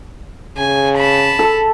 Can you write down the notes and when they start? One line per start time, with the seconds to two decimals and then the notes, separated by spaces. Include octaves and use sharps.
0.57 C#3 G#5
0.96 A5 B5
1.39 A4